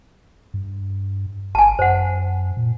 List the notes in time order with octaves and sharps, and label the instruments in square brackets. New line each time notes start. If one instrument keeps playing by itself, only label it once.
[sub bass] G2
[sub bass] G#1 [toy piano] G#5 A5
[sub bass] F#2 [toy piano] C5 F#5
[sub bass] A#2